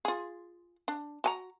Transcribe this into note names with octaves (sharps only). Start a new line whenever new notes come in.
F4 G#4
D4
F#4 G#5 A#5